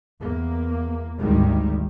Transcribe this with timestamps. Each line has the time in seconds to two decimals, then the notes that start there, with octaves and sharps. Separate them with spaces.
0.20 E2 A#3
1.19 G#1 D2 D#3 G3 G#3